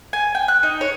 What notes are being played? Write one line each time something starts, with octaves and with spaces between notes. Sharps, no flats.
G#5
G5
F#6
D#4
C#5